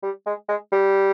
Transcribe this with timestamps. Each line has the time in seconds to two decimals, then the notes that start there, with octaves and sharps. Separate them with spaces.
0.03 G3
0.26 G#3
0.49 G#3
0.72 G3